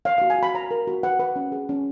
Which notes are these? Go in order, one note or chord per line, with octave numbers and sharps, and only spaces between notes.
C#5 F5
F#4 F5
G#5
F#4 B5
C#5 A#5
A#4
F#4
B4 F#5
B4
C#4
G#4
C#4